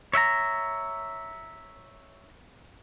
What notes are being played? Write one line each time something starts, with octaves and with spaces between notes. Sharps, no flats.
C#5 E5 F#5 A#5